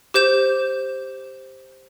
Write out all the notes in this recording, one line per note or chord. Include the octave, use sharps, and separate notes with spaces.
G4 C5 G6 E7